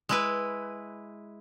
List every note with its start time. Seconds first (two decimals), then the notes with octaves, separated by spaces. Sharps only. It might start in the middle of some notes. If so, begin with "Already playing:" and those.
0.09 G#3 E4 B4